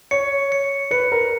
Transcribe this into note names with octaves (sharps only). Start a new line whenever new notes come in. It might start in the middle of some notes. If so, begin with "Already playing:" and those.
C#5 C#7
C#7
B4 C#7
A#4